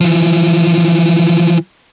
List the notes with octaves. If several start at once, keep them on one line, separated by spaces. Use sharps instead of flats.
E3 F3